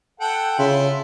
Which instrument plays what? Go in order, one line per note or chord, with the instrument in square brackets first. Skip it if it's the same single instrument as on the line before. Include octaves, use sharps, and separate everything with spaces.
[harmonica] A4 F#5 G5
[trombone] C#3 [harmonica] E4 F4